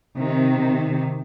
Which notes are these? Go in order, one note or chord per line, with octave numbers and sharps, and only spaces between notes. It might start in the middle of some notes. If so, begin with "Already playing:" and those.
C3 D#3